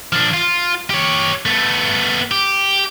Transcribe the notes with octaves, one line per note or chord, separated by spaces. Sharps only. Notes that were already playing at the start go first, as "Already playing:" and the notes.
F3 D4
F4
G4 C#5
A3 B3
G4